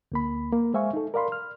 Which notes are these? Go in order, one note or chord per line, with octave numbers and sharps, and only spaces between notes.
D2 A#3 B5
A#3
G#3 C5 E5 F5 G#5 C#6
D#4 A4
A#4 D5 F5 B5 C6
F6